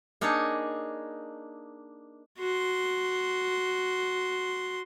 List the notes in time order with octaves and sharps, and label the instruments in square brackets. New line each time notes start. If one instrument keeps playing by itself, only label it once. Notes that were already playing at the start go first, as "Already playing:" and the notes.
[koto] A#3 D4 D#4 G#4 C#5
[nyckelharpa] F#4 C6